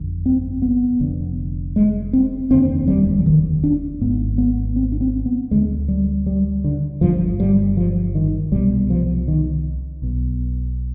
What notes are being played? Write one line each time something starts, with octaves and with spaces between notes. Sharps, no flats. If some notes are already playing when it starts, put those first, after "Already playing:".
Already playing: G1 F2 D3
C4
B3
F1 F2 D3
G#3
C4
F1 D#2 D3 C4
G3
F3
D#3
D4
G#1 G#2 B3
B3
C4
D4
C4
B3
D2 D3 G#3
G3
G3
D3
G1 G2 D3 F3
G3
F3
D#3
C2 B2 G3
F3
D#3
B1 B2